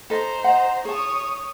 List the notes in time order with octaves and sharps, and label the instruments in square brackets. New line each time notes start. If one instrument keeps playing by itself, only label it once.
[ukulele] A4 D#5 [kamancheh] C5 A#5
[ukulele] D#5 F#5
[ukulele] G#4 A5 [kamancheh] C#5 D#6